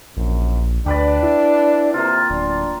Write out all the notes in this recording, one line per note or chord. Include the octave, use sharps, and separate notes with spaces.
A#1 F#2
D2 D4 G4 B4 D5
E4
C3 A#3 F4
D1 D4